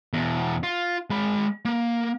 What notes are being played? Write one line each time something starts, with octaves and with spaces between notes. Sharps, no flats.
E2 B2
F4
G#3 B5
A#3